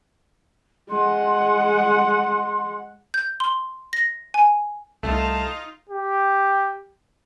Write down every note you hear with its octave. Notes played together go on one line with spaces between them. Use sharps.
G#3 F#5 C6
G6
C6
A#6
G#5
C2 A3 D#4 F4 A5
G4